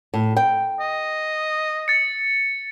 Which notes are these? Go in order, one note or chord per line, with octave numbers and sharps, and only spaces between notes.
A2
G5
D#5
A6 C#7